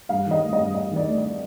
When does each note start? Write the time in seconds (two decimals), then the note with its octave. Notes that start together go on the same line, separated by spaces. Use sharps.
0.09 G2 F5
0.26 D#3
0.31 D#5
0.42 A3
0.53 D#5
0.59 G2
0.74 G2 D#5
0.91 D#3 D5
1.07 A3
1.18 D5